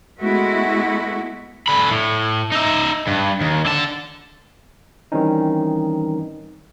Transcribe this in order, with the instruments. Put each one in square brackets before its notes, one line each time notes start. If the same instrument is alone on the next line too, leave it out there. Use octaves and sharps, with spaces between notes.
[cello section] G#3 A3 B3 E4 F#4
[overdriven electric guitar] D3 B5
A2
D#4 E5
G2
D#2
D3 A5
[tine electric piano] D#3 E3 G3 C4 C#4 D#4